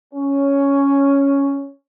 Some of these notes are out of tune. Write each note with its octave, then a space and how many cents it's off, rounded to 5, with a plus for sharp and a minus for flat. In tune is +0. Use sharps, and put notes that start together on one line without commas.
C#4 +5